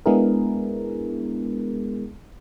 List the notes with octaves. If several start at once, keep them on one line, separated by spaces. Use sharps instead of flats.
G#3 B3 D4 E4 G#4 A#4